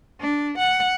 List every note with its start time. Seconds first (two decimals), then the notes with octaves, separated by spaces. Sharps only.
0.21 D4
0.58 F#5